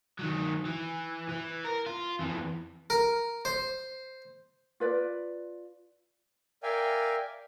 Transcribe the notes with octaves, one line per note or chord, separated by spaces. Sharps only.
D#3 F#3
E3
E3
A#4
F4
F2 E3
A#4
C5
F4 B4 D5
A#4 D5 E5 F5 G5 G#5